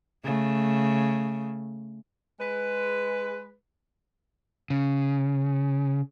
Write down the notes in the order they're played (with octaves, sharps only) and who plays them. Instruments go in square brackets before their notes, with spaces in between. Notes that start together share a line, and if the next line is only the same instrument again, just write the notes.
[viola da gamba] C#3 A3
[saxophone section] G#3 B4
[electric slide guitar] C#3